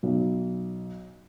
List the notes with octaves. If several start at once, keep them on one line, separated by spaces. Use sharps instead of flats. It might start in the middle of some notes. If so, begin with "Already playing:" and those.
B1